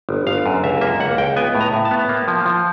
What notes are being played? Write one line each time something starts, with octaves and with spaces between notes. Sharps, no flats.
G1
G1 F5
F#2
C#2 E5
A#3 E5
C#2 F#5
C#2 G5
B3 G#5
A2
A#5
A2
A5
B3
A#3
F3
F3